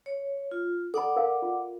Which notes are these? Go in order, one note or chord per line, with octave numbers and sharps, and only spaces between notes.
C#5
F4
A4 D5 F#5 B5 D6
A#4 F5
F4